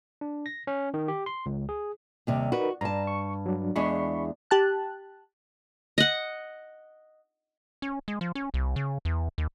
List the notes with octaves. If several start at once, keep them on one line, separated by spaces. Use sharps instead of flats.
D4
A#6
C#4
D#3
G4
C6
C#2
G#4
D#2 C3 G3
D#4 F#4 A#4 B4
G2 A5 A#5
C#6
F#3 D4
E2 G#3 D4 B5 C#6
G4 A5 F#6
D#5 F#5
C#4
G#3
F3
C#4
C2
C#3
E2
D#2